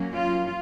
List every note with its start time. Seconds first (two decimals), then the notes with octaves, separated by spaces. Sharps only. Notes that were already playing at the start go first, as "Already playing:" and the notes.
Already playing: F#3 A#3 C#4
0.14 F4